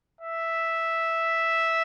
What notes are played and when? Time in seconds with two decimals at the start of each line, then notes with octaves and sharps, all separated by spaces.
0.21 E5